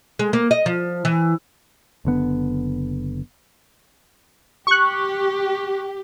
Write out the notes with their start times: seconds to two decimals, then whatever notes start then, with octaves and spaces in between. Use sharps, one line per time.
0.19 G#3
0.33 A#3
0.51 D#5
0.66 F3
1.05 E3
2.05 F#1 D3 B3
4.67 G4 C#6 F#6